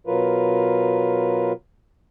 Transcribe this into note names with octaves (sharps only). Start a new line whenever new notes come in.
B2 F#3 F4 A#4 B4